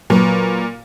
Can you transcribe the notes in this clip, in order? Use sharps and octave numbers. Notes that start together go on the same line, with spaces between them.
A#2 F#3 B4